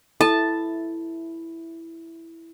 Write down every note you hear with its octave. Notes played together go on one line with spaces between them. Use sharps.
E4 A4 A5